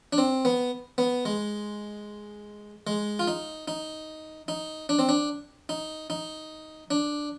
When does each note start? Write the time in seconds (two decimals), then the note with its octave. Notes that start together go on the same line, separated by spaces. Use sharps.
0.13 D4
0.18 C4
0.45 B3
0.98 B3
1.26 G#3
2.87 G#3
3.19 F4
3.28 D#4
3.68 D#4
4.48 D#4
4.89 D4
4.99 C4
5.09 D4
5.69 D#4
6.10 D#4
6.91 D4